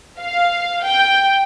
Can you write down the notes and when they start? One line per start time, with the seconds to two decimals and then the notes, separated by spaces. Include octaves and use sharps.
0.20 F5
0.86 G5